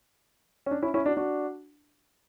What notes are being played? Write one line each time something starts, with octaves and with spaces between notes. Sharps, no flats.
C#4
D4
C#4 E4
C#4 E4
D4 F#4
D4 F#4